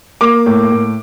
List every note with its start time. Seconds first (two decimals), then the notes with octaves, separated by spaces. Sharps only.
0.21 A#3 D6
0.46 A2
0.71 A2